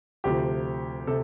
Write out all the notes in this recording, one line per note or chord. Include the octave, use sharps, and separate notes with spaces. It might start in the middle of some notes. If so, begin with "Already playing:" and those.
D2 C3 F3 G4
C3 A4